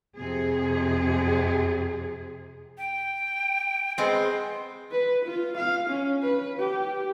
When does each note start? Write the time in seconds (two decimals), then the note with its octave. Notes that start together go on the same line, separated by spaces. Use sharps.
0.17 F2 C3 G#4
2.78 G5
3.98 G#3 B3 C4 C6
4.91 B4
5.25 F4
5.57 F5
5.89 C#4
6.22 B4
6.59 G4